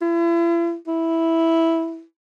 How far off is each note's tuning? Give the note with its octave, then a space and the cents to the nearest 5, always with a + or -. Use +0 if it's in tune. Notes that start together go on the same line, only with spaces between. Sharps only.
E4 +40
E4 -5